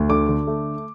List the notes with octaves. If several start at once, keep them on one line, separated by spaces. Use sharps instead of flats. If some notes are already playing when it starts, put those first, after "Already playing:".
Already playing: D2
D3 D6
D3
A3